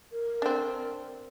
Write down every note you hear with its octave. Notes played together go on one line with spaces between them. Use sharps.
A#4
C4 D4